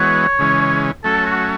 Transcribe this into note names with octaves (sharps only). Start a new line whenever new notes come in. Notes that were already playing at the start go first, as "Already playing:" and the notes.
Already playing: E3 G#3 B3 F#4 C#5
C#3 E3 G#3 C#4
F#3 A3 C#4 A4
F#4